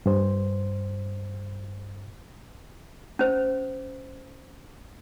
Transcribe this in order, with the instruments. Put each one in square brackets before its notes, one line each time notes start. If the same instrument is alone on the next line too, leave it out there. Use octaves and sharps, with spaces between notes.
[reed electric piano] G2 C5
[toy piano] C#4 C5